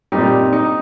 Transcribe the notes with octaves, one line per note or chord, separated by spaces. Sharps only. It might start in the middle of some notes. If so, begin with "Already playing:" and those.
A#2 G3 C4 D#4 G4
D#4